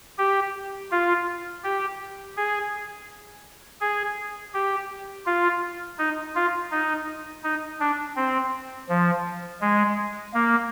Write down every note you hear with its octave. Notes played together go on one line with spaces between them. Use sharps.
G4
F4
G4
G#4
G#4
G4
F4
D#4
F4
D#4
D#4
D4
C4
F3
G#3
A#3